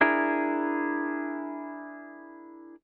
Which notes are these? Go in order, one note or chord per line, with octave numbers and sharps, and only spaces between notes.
D4 E4 G#4 A#4